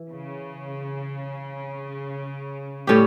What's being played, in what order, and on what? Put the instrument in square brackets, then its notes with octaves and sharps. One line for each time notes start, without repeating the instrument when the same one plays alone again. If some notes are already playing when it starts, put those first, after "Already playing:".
Already playing: [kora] E3
[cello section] C#3
[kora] A2 G3 C#4 G4